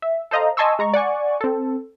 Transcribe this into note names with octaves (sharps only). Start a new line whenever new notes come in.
E5
A4 C5 D#5 F5 A#5
D#5 G#5 A5 C6 C#6 E6
G#3 A#5 C#6
D5 F#5 G#5 C#6
C4 A4